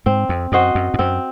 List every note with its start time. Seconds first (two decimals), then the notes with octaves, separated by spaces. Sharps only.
0.06 G#2 C4
0.29 F2
0.52 F#2 F#4 C5 D#5
0.75 F#2
0.94 G#2
0.99 F#2 C4